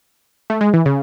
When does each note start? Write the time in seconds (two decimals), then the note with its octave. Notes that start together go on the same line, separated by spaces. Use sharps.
0.50 A3
0.61 G#3
0.73 E3
0.86 C#3